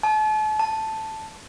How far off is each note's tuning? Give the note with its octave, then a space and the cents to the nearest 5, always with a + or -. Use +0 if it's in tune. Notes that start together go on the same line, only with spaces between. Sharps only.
A5 -40
A5 +0